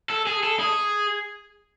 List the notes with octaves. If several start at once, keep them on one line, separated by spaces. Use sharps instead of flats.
A4
G#4
A4
G#4